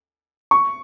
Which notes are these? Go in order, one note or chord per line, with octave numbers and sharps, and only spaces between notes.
C#6